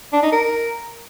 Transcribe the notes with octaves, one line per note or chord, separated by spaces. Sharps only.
D4
D#4
A#4